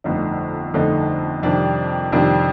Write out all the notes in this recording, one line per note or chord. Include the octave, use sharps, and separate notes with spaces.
G1 F2 D3 A3 D#4
G1 F2 D3 A3 D#4
F2 C3 D#3 G3 D4
F2 C3 D#3 G3 D4